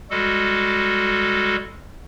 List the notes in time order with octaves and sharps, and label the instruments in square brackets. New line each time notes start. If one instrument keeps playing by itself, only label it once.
[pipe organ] G3 G#3 F#4 A4